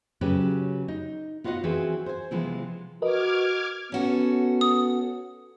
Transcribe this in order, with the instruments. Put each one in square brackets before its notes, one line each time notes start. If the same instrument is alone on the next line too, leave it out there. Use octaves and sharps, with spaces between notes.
[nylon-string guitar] C#3 F#3 C#4 G4 B4
D#4
B3 F4 F#4 C5 D#5 F#5
E3 C4 F#4 G#4 B4
C5 G#5
C3 E3 F3 G#3 B3
[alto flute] F#4 [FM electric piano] A#4 B4 D#5 [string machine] D6 F6 G#6
[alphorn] B3 [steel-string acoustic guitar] C#4 F#4 A4
[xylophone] D#6